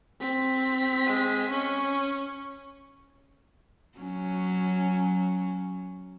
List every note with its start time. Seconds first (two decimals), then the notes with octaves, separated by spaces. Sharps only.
0.21 C4 B6
1.06 G#3
1.51 C#4
3.98 F#3 C#4